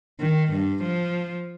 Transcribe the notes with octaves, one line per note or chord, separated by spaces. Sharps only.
D#3
G2
F3